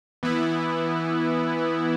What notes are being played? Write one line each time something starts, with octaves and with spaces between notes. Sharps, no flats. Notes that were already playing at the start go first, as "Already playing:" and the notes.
E3 B3 E4